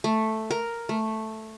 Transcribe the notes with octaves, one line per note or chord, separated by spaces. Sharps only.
A3
A#4
A3